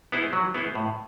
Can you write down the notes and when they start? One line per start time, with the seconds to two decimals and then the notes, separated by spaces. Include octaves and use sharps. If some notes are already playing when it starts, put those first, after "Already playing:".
0.12 B3 E4 G#4 C5
0.33 F#3
0.54 B3 E4 G#4 C5
0.75 A2